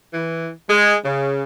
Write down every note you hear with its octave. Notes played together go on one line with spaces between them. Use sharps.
E3
G#3
C#3